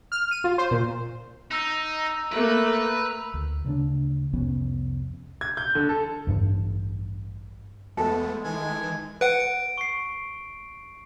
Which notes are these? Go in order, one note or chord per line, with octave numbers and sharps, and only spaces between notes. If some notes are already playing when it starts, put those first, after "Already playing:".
F6
D#7
F4
C5
A#2
D#4 A#5 E6
A3 A#3 B4
D2
D2 C#3 A3 D4
C2 F2 B3 C#4
G#6
G6
D3
A4
A1 G2 D4
E2 G#3 A3 B3 A4
D#3 E3 G#5
B4 F#5 D7
D7
C#6 C7